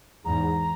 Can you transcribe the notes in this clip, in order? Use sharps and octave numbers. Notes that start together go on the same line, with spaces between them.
E2 G#2 A#5